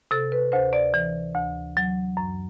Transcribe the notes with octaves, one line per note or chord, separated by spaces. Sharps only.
C3 A4
B4
D2 C5
D5
E3
D2
F#3
F#2